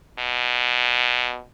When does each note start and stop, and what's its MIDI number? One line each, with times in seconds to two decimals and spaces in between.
0.19 1.40 47